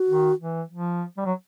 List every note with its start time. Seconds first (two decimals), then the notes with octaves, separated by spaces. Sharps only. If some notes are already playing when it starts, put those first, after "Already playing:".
Already playing: F#4
0.09 D#3
0.40 E3
0.71 F3
1.17 G3
1.25 F#3